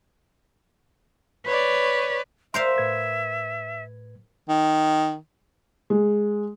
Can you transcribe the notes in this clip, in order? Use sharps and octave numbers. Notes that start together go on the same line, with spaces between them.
B4 C#5 D5
A#4 C5 E5 F5 C6
A2 B4 G#6
D#3
G#3